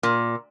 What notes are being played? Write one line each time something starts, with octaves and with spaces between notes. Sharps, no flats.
A#2